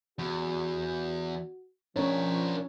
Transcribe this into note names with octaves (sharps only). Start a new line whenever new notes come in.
E2 F#4
F3 C#4 D4 A#4 C#5